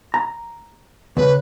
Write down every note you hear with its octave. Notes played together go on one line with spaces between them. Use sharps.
A#5
D2 C#3 B4